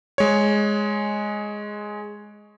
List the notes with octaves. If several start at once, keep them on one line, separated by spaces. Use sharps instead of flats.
G#3 C#5